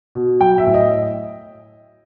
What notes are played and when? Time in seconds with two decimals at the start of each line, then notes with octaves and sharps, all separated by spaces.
0.15 B2
0.41 F#3 G5
0.58 E5
0.67 A2
0.74 D#5